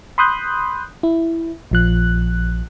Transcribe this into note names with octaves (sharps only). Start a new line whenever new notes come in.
B5 C6 D#6 F#6 G6
E4
A#1 F3 F#6